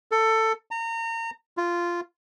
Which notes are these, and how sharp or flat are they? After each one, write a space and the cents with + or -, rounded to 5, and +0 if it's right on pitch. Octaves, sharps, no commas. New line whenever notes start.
A4 +15
A#5 -30
F4 -10